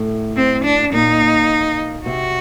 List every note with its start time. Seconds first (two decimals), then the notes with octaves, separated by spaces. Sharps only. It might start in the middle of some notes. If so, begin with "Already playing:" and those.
Already playing: A2 A3
0.36 C4
0.65 D4
0.93 A#2 A#3 D#4
2.06 C3 C4 F#4